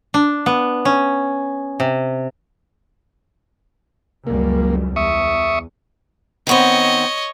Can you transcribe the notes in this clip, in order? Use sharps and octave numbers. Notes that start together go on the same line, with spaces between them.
D4
B3
C#4
C3
C#2 F#2 G3 A#3
E2 E5 C#6 D#6
D#3 B3 C4 C#5 D#5